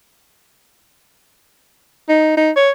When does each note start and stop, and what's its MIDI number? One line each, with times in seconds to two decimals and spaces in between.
2.09 2.35 63
2.37 2.51 63
2.56 2.71 73